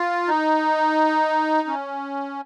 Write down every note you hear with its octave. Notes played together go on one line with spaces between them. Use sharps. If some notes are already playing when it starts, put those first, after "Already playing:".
Already playing: F4
D#4
C#4